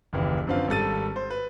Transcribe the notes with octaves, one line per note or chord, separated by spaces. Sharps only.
F#1 D#2 E3
F#2 D3 F3 C4 B4 F5
G#1 G3 A4 A6 D#7
C5
B4